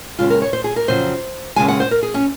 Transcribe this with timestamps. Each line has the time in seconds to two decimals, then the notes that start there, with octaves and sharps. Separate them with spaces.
0.19 D#2 C#3 G#3 F4
0.30 A#4
0.42 C#5
0.53 C5
0.64 G#4
0.76 A#4
0.88 F2 C#3 F#3 C5
1.56 D#2 C#3 G#3 G#5
1.68 F#5
1.80 C5
1.91 A#4
2.03 G#4
2.14 C#4